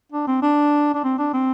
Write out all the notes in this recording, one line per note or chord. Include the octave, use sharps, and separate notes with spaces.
D4
C4
D4
D4
C4
D4
C4